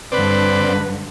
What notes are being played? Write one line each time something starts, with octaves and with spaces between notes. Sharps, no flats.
G2 D3 C4 B4 D5